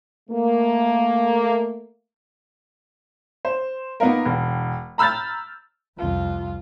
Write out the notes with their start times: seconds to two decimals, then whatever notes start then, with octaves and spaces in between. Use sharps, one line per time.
0.30 A3 A#3
3.45 C5
4.00 A#3 B3 D#4 F4 A#4
4.25 E1
4.98 A#5 B5 E6 F6 G6 A6
5.98 C2 F2 F4